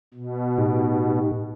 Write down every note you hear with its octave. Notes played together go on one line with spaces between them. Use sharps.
B2
A2 D#4 G4